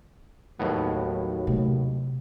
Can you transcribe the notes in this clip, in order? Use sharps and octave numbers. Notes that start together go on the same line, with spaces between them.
D#2 A2 F#3 B3
C3 A3